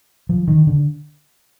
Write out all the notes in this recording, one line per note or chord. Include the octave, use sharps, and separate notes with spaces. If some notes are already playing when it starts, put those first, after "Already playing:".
F3
D#3
D3